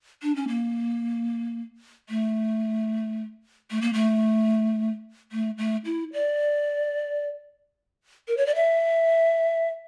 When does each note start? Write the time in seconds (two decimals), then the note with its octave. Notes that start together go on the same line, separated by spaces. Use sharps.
0.23 D4
0.36 C#4
0.48 A#3
2.09 A3
3.71 A3
3.82 A#3
3.93 A3
5.32 A3
5.58 A3
5.85 E4
6.13 D5
8.28 A#4
8.37 C#5
8.46 D5
8.55 E5